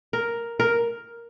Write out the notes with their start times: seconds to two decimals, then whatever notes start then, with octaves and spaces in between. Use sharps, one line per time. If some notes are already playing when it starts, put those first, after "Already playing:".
0.13 A#4
0.60 A#4